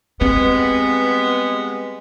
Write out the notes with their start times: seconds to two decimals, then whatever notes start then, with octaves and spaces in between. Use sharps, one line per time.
0.21 G3 G#3 B3 C4